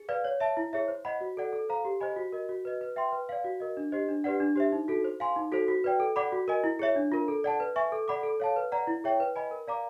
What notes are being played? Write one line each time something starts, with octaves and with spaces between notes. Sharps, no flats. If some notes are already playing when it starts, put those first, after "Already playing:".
Already playing: G#4
B4 D5 F5
C#5
E5 A5
E4
G#4 C#5 E5
C5
D#5 F#5 B5
F#4
A4 D5 F#5
A4
C5 F5 A#5
G4
C5 D#5 G#5 B5
F#4
A#4 D#5
F#4
B4 D#5
B4
E5 G5 C6
B4
D5 F5
F#4
A#4 D#5
D4
G4 C5 D#5
D4
G4 B4 D5 F#5
D4
G4 C5 E5
D#4
F#4 A4
C5
F5 G#5 C6
D#4
F#4 A4 C5
F#4
B4 D5 G5
A4
D5 F#5 B5 D6
F#4
A#4 D#5 G#5
E4
G#4 C#5 E5
D4
F4 A#4
A4
D5 F#5 A5
B4
E5 G#5 C#6
A4
D5 F#5 B5 D6
A4
C#5 F5 A5
B4
D5 F#5 A#5
E4
G#4 C#5 E5 G5
B4
D#5 G#5 B5
A#4
D5 F5 A#5 D6